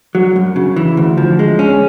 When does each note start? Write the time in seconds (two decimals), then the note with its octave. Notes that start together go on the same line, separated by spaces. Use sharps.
0.15 F#3
0.36 F#2
0.56 C#3
0.76 E3
0.97 D2
1.17 F3
1.39 G#3
1.59 C#4